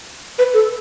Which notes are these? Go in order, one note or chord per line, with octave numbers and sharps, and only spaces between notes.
B4
A4